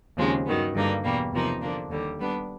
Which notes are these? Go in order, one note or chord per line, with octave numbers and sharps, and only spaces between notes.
D#2 C#3 F3 G#3 C4
G2 D#3 F#3 B3
G2 D3 G3 A#3 D#4
E2 B2 G3 A#3
E2 C3 F3 A#3 D#4
D3 F3 A#3 D4
D#2 D3 G3
G3 B3 D4